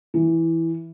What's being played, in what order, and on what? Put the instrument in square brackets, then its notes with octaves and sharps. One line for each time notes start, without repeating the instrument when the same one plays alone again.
[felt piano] E3